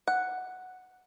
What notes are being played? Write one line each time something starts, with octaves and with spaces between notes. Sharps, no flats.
F#5